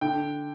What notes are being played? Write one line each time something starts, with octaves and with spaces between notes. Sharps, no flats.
D3 G5